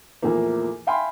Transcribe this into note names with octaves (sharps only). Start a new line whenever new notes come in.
E2 A#2 F3 A3 A#3
E5 F5 G5 G#5 B5 C6